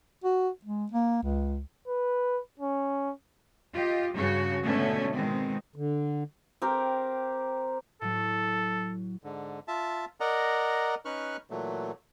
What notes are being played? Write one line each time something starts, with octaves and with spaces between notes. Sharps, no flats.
F#4
G#3
A#3
C#2
B4
C#4
F4 G4 D#5
G2 C#3 F#4 C#5
G#2 B2 D3 A3 C#4
B2 D#3 G#3 C4
D3
C4 G4 A#4
A2 F#3 A4
G#2 D3
F4 E5 A5
A#4 D5 D#5 F#5 A#5
C#4 D#4 B4 C#6 F6 F#6
A#2 E3 F#3 A3